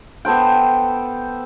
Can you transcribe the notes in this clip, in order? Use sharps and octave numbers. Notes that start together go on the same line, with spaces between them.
B3 A4 C5 G5